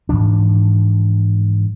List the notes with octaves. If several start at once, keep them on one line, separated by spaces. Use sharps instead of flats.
G#2 E3 F3 D4